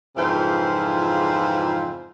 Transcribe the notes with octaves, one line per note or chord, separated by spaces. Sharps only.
F2 G#2 C#3 E3 F4 C5